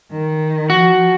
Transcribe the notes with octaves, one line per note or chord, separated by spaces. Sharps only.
D#3
F3 F#4